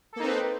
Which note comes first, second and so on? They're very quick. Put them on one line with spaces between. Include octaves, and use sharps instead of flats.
A4 A#3 D#4 C4 B4